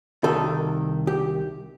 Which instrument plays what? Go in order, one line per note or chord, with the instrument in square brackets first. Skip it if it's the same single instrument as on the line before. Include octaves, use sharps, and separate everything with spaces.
[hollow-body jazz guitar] C2 C3 D#3 A4
G4